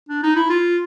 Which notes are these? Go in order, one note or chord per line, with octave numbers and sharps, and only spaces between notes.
D4
D#4
E4
F4